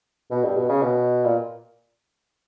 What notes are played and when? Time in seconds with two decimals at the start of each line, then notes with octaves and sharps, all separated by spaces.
0.31 B2
0.44 G2
0.56 B2
0.69 C#3
0.82 B2
1.25 A#2